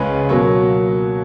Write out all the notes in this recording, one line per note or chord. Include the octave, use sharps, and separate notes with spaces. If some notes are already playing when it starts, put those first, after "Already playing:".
Already playing: C#2 C#3 G#3 C#4 B4
B2 F#3 A#3 C#5